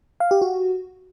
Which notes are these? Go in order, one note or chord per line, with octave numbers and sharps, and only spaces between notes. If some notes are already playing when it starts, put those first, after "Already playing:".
F5
G4
F#4